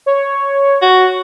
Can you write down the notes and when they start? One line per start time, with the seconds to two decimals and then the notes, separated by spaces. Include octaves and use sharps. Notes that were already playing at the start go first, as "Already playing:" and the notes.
0.06 C#5
0.82 F#4